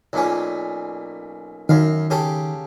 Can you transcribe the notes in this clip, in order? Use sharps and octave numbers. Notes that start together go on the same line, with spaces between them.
B1 A#2 C#4
F#2 D#3 F5
C#3 G4 A4